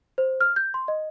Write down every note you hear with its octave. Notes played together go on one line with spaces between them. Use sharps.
C5
F6
G6
C6
D#5